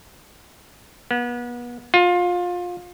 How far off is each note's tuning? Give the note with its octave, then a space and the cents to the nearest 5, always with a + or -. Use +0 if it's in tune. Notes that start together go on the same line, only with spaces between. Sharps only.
B3 -35
F4 +25